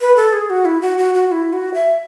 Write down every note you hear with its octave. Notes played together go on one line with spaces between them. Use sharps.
B4
A4
G#4
F#4
E4
F#4
F#4
F#4
E4
F#4
E5